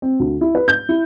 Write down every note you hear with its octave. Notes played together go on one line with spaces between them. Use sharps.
C4
D2
E4
B4
G6
E4